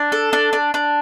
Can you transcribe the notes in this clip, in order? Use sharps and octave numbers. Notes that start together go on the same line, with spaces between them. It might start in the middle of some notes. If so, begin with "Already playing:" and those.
Already playing: D4
A4
D4
D4
D4